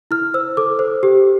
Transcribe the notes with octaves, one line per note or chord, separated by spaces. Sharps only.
E4 F6
C5 E6
A4 D6
C5
G4